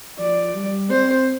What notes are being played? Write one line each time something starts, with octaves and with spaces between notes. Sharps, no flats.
F3 D5
G3
C4 C5